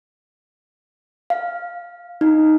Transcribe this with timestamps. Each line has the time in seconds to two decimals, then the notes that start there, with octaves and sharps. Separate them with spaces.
1.30 F5
2.21 D#4